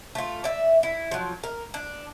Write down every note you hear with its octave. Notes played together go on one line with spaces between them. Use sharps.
A3 F4
D5 E5
E4
F3 F#3
A#4
D4